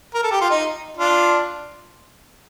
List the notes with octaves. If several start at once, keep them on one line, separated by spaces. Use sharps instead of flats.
A#4
A4
G4
F4
D#4
D4 F4